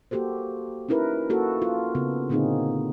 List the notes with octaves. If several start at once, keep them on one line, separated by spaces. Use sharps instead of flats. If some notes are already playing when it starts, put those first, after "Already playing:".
A#3 F#4 G4 A4 C5
C#4 D#4 E4 A#4 B4
A#3 F#4 A4
F4
C#3 B3 C4
A#2 D3 A#3 C4 D#4 G#4